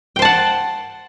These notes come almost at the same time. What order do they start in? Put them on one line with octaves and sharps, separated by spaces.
G5 C5 A5 F#5